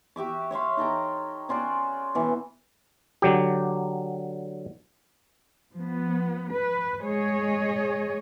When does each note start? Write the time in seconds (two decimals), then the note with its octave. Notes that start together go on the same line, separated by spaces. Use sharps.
0.16 F#4 G4 E5 D6
0.51 C#5 E5 F5 C6
0.77 D#4 A4 G5 A#5
1.49 C#4 F4 F#4 D5
2.15 B2 E3
3.22 D3 F#3 G4
5.77 F3 B3
6.52 B4
7.03 G#3 G#4 C#5 D#5